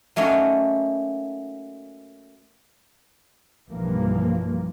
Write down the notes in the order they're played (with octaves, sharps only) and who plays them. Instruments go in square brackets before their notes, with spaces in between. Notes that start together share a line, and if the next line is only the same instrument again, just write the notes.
[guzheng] F#3 A3 A#3 C#4 D#4 F#4
[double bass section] B1 G2 E3 F3 A#3